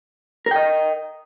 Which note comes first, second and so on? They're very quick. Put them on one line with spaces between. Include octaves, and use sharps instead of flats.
A#4 G5 D#5